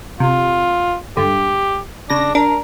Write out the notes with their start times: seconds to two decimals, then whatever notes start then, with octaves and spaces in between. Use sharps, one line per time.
0.20 C3 F4
1.17 G2 D3 G4
2.10 C#3 D4 A#6
2.35 D4 A#4